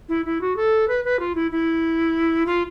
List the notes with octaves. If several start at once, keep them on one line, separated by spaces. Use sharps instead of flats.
E4
E4
F#4
A4
B4
B4
F4
E4
E4
F4